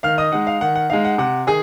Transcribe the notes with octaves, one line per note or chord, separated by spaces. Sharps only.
D#3 F5 F6
D#5 D#6
G#3 D#4 F#5
F5
D#3 F#5
F#5
G#3 D#4 F5
F#5
C3 F#5
D#3 G#4 G#5